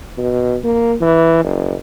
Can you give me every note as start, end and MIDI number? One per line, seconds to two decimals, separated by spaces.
0.18 0.57 47
0.64 0.95 58
1.01 1.43 52
1.44 1.74 30